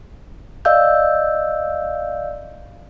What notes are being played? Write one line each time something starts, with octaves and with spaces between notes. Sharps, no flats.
D5 D#5 F5 E6 G6